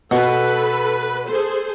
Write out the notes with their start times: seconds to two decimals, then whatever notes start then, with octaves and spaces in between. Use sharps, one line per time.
0.11 B2 A4 B4
1.28 G#4 A4 C5